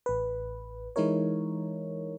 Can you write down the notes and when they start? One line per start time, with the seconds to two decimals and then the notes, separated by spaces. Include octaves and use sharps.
0.06 A1 B4
0.96 E3 G#3 D#4 E4 A#4 C#5